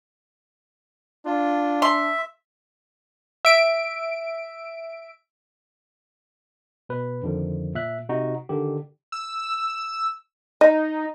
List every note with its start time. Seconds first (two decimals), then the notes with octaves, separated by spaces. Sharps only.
1.26 D4 F4
1.82 E5 C6
3.45 E5 D7
6.89 B2 B4
7.22 F2 D3 D#3 F3
7.75 A#2 E5 F#6
8.09 C3 D#4 F#4
8.49 D3 D#3 G4
9.12 E6
10.61 D#4 D#5